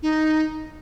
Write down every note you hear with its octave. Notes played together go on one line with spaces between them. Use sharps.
D#4